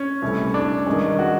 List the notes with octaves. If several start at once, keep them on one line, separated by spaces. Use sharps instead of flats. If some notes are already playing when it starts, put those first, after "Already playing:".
Already playing: C#4
C2 C3 E3 A3
D4
G2 D#3 G#3 C#4
F#4